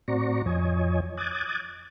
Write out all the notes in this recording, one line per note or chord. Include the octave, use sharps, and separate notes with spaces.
A2 C4 F#4 D5 A#5 C#6
F2 F3 C#5 D#5 G#5
D6 D#6 F#6 G#6 A6